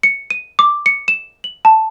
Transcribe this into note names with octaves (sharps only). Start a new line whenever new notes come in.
C#7
D#7
D6
C#7
E7
F#7
A5